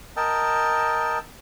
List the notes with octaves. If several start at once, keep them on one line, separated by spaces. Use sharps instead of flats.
A#4 D#5 G5 A5 E6